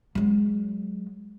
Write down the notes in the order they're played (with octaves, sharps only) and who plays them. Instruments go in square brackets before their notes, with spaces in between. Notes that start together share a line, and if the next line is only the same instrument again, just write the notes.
[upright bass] F#3 G#3